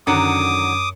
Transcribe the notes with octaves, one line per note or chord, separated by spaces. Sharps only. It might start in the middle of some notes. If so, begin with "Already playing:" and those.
F#2 D3 D#3 F#3 D6 D#6 C#7